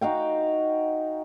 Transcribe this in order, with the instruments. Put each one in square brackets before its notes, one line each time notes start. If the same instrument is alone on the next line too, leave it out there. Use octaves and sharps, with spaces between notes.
[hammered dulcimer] D#4 F#4 F5 G5